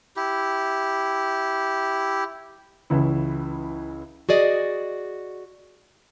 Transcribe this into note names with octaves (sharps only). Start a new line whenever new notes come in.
E4 G4
C#2 C#3 E3 E4
F#4 G#4 D5 D#5